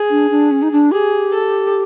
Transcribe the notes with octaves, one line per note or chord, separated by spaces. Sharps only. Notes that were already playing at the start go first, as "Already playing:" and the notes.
Already playing: G#4
D4
D4
C#4
D#4
D4
G4 G#4
A4